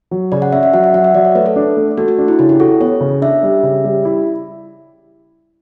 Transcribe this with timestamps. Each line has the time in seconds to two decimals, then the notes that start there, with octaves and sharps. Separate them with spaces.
0.11 F#3
0.32 C#3 D5
0.42 F#5
0.53 C#4 E5
0.63 E5
0.73 F#3 F#5
0.84 E5
0.94 F#3 F#5
1.04 E5
1.14 F#3 D5
1.25 C#5
1.35 A3 B4
1.46 A4
1.56 D4
1.77 A3
1.98 A3 F#4
2.08 F#4
2.18 D4
2.28 E4
2.39 C#3 E4
2.49 G4
2.60 F#4 A4
2.80 B3 C#5
3.01 C#3
3.22 D4 E5
3.43 G3
3.63 C#3
3.84 G3
4.05 E4